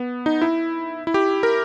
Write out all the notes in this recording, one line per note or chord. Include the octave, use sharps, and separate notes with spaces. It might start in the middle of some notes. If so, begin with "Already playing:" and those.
Already playing: B3
D#4
E4
E4
G4
A#4